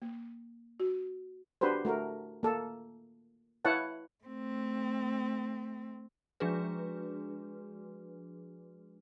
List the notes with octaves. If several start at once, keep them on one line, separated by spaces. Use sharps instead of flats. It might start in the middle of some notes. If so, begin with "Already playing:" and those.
A#3
F#4
D4 F#4 G4 B4 C5
A3 F#4 A#4
A#3 A4
E4 B4 C#5 F5 F#5 A5
A3 C4
F3 G#3 D4 F#4 G#4 B4